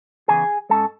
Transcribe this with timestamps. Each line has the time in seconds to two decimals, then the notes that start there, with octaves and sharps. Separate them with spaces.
0.28 C#3 E3 B3 G#4 G#5
0.69 G#2 G#3 C#4 A4 A5